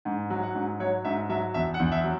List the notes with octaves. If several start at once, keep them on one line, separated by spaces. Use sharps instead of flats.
G#2
F#3
F#5
G#2
F#3 C#5
G#2 E5
F#3 E5
E2 E5
F#5
E2
E5
F#3